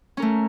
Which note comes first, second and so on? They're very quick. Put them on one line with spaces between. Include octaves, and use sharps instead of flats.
C#4 A#4 A3